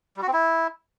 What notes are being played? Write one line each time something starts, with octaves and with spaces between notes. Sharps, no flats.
G3
F#4
C4
E4